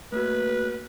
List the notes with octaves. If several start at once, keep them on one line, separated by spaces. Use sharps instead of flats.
A3 A#3 F#4 B4